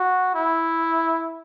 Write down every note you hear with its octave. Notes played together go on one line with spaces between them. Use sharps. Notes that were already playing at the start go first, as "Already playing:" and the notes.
Already playing: F#4
E4